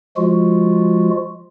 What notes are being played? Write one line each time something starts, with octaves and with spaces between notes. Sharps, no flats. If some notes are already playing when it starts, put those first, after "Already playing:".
F3 G#3 F4 F#4